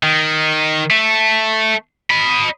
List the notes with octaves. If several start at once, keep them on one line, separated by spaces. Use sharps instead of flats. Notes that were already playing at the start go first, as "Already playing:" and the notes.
D#3
A3
D#5 B5